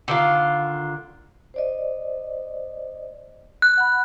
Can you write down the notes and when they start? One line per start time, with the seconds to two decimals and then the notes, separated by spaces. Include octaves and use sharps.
0.08 D3 D#3 F4
1.54 C5 D5 D#5
3.62 F#6
3.77 F#5 B5